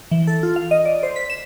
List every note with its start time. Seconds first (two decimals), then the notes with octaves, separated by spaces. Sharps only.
0.11 E3
0.27 A4
0.43 F4
0.56 F5
0.71 D#5
0.85 D5
1.03 C5
1.16 B6
1.30 E7